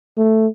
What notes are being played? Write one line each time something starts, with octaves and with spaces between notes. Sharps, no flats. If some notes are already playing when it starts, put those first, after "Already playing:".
A3